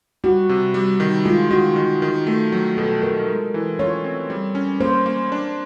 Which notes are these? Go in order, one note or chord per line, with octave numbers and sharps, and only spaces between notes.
G3 F#4
C3
G3
D#3
G#3 F4
D#3 F#4
D#3
D#3
A3
F#3
B2 A4
B2 A#4
G#3
E3
F4 C#5
C4
G3
C#4
A#3 C5
A#3
D4